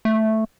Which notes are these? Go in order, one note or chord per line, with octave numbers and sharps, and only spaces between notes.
A3